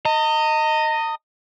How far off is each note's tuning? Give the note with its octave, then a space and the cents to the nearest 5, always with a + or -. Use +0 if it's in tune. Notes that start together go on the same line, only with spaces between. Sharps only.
D#5 +5 A#5 -45